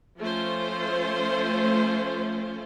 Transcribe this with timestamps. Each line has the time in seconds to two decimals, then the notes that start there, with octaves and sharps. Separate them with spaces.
0.19 F3 A3 C#4 F4 C5